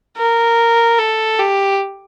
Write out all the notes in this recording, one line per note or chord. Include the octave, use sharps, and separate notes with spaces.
A#4
A4
G4